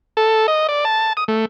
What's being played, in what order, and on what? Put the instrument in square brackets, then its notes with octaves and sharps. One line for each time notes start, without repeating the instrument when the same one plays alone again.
[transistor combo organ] A4
D#5
D5
A5
D#6
A3